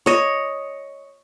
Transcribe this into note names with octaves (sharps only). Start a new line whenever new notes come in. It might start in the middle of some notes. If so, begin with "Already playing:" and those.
C#5 D#5